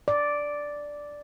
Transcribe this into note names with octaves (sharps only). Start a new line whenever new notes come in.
D5